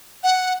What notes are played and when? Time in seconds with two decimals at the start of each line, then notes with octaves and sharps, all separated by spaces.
0.23 F#5